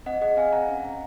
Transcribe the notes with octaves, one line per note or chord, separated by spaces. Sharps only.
C4 D#5 F#5
G#4 D#5 F#5
C4 F5 G#5
C4 F#5 A#5
C#4
C#4